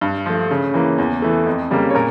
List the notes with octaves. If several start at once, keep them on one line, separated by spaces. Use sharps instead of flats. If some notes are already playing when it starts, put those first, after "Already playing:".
G2
F3 A3
C#3
E3 A#3
E2
E3 A3
F2
C#3 G3 A#3
C#5
A#2 A#4